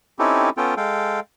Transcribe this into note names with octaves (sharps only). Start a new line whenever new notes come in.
C4 C#4 D#4 E4 G4 A4
B3 C#4 F4 A4 G5
G#3 A4 F5 G5